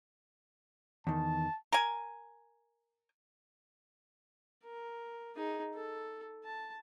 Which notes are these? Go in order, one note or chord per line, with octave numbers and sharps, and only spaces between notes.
E2 D#3 A5
A#4 G#5
A#4
D#4 G#4
A4
A5